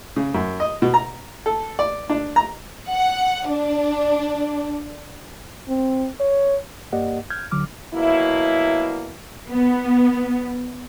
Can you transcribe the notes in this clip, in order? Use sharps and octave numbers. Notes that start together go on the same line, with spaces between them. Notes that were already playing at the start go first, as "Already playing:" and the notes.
C#3
F#2
D#5
B2
A#5
A4
D5
D4
A#5
F#5
D4
C4
C#5
G2 A#3 G4 D5 D#5 F#5
F6 G6 G#6
D2 D3 F#3 D6 F6
B2 F#3 A#3 E4
B3